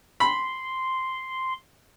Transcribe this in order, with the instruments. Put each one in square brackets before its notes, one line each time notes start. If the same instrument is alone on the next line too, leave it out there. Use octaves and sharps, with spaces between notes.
[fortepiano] B5 [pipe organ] C6